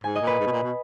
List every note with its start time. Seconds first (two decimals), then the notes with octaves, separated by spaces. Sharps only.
0.04 G#2 G#5
0.15 D#5
0.21 A#2
0.27 B4
0.40 G#2
0.47 B2
0.52 A#2
0.63 B2